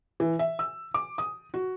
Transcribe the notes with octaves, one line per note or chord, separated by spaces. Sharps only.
E3
E5
E6
D6
D#6
F#4